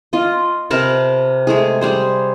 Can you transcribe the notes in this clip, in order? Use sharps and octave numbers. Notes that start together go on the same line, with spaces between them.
F4 D#5
C3 A#4 B4 A5
G#3 A3 G#4
G3 G#4 C5